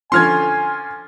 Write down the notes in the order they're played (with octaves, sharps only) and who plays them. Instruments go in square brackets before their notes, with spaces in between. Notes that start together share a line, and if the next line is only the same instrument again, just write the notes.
[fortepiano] D3 F3 C#4 [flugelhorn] G#5 [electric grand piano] C6 F6 G#6